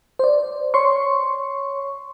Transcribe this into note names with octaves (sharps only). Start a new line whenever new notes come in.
C5 D5
C#5 C6 C#6